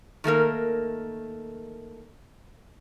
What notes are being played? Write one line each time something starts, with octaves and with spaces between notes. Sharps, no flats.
D#3 A3 A#3 A#4